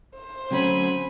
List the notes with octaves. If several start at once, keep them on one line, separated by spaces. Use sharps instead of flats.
C5
D3 F#3 A3 C4 C#4 G#5 B5